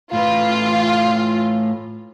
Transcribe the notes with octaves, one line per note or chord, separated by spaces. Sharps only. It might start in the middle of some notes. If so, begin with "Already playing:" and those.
A2 F4 B4